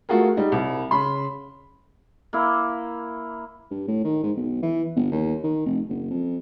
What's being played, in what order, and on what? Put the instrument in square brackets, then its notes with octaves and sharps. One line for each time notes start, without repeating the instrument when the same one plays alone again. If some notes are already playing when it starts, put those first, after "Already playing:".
[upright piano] A3 F4 F#4 G#4 A#4
G3 D#4
C2
C#3 B5 C6
[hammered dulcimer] A#3 E4
[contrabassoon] G2
A2
D#3
G#2
B1
E3
G1
D#2
D#3
F1
F#1
F2